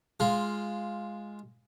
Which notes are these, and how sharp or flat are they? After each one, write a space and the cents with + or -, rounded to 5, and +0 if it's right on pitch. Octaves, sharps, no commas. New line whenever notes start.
G#3 +0 F4 +0